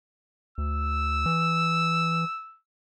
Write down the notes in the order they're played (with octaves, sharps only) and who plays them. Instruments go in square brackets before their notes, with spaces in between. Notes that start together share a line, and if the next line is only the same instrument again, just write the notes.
[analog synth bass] D2 [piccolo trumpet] E6
[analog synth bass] E3